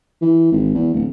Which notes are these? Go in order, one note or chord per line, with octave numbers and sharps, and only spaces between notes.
E3
G#1
E2
D1